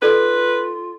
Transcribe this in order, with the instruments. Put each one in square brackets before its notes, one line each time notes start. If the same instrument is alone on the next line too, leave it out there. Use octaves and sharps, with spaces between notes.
[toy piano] D#4 A4 D5 [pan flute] F4 [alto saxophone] B4